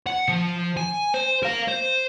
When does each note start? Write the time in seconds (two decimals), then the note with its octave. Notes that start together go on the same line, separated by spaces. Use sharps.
0.07 F#5
0.29 F3
0.77 G#5
1.14 C5
1.43 A#4 F5
1.68 C5